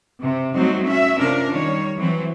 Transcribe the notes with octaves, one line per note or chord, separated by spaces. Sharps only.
C3
F#3 G3 A3 C4 D#4 F#4
C#4 F#4 E5
C3 C#4 D4 F4 A#4
D#3 G3 C#5
E3 F#3 C4